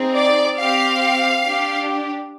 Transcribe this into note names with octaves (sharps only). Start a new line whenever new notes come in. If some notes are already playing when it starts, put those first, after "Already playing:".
Already playing: C4 D#4 G#4
D5
C4 G4 F5
D4 G4